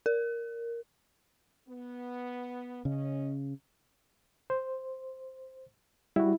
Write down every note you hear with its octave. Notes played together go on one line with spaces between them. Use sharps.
A#4
B3
C#3 C#4 D#5
C5
G3 E4 F#4